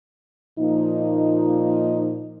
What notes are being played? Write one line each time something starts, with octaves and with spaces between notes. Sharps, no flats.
A#2 F3 A#3 D#4